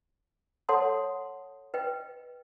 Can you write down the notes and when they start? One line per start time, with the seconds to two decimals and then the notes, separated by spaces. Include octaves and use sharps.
0.69 A4 C#5 F#5 A5 C6 D#6
1.74 B4 D#5 G5